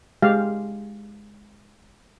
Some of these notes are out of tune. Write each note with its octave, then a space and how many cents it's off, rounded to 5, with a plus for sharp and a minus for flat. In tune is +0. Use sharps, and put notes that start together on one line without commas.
G#3 +0 G4 +0 F5 -5